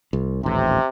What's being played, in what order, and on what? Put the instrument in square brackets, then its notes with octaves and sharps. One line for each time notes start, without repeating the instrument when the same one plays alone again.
[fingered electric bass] C2
[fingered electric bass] D#1 A1 [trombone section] C3